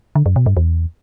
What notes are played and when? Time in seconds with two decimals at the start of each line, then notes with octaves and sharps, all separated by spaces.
0.15 D3
0.26 F#2
0.36 B2
0.46 G2
0.57 E2